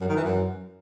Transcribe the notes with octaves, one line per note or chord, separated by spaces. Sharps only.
F#2
D#3
E3
F#2